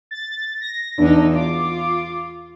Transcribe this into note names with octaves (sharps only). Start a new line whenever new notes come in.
A6
A#6
E2 D4 D#4
F4 D6